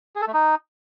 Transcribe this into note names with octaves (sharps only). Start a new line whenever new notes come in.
G#4
A4
A3
D#4